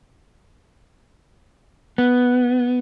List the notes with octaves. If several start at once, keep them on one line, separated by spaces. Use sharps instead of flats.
B3